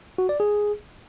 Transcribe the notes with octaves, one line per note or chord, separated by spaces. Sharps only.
F#4
D5
G#4